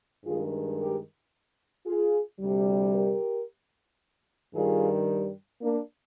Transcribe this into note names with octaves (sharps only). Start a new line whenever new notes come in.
G2 D#3 G#3 F4 G#4
G4 A#4
F4 G#4
D2 C3 G3
G4 A#4
G2 D#3 G3 F4 G#4
A#3 D4